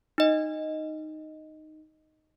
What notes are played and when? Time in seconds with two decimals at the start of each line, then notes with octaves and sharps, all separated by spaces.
0.18 D#4 D#5